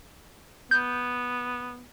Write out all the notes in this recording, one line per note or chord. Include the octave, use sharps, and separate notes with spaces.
B3 G6